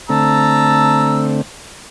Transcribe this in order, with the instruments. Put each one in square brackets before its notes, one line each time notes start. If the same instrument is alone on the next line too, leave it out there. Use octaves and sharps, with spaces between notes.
[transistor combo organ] D3 A3 C4 [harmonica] A5 A#5 E6